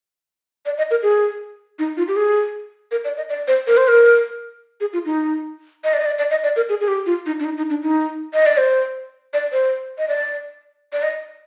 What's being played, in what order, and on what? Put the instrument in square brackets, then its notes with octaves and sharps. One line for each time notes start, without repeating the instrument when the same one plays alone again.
[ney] D5
D#5
A#4
G#4
D#4
F4
G4
G#4
A#4
D5
D#5
D5
C5
A#4
C5
A#4
G#4
F4
D#4
D#5
D5
D#5
D5
D5
D#5
D5
A#4
G#4
G#4
G4
F4
D#4
D4
D#4
D#4
D4
D#4
D#5
D5
C5
D5
C5
D#5
D5
D5
D#5